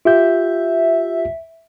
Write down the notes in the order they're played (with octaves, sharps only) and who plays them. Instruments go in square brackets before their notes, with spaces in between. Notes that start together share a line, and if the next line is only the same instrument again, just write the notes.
[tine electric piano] F4 G4 G6 [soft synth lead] E5